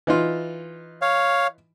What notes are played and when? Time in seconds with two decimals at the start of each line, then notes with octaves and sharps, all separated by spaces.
0.07 E3 D#4 F4
1.02 C#5 F5